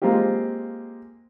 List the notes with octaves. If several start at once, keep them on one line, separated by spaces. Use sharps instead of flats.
G#3 A#3 C4 F4 G4